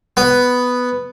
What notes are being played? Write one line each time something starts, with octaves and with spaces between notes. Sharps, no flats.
B3